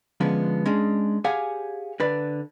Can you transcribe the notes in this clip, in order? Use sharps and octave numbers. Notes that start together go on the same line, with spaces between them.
D3 F3 G#3 B3 C#4
G#3 C#4 D4
G4 G#4 C#5 F5 F#5 G#5
D3 B4 D5